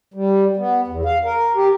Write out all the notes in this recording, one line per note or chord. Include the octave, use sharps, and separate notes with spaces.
G3
B3
E2
F5
A#4
G4